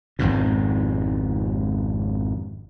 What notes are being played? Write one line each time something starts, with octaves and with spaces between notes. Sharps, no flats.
G#1 F2 G#2 B2